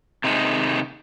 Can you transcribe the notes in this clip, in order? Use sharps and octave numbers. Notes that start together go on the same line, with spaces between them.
C3 D#3 G#3 D#4